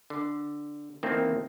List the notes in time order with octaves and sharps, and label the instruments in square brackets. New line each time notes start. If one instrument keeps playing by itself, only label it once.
[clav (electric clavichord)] D3
E2 D#3 A3 A#3 C4